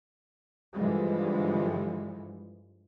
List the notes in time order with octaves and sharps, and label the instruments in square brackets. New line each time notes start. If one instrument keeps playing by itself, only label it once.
[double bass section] G2 D3 E3 F3 G3 G#3